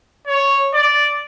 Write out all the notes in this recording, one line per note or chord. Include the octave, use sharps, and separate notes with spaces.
C#5
D5